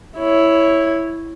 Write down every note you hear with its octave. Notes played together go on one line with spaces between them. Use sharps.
E4 C#5